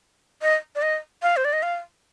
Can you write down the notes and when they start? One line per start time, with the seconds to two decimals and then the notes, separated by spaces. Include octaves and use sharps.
0.42 D#5
0.75 D5
0.82 D#5
1.22 F5
1.37 C5
1.45 D5
1.53 D#5
1.63 F5